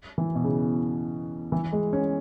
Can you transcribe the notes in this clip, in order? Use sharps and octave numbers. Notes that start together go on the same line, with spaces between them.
E3
B2
C#3
E3
G#3
C#4